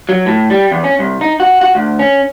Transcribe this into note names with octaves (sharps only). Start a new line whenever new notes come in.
F#3
A2
G3
E2
C#4
C2
D#4
F#4
F#4
D2
C#4